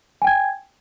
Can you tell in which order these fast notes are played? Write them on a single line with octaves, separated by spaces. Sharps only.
G#5 G5 G#6